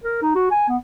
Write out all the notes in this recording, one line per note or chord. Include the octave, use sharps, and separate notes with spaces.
A#4
D#4
F#4
G#5
B3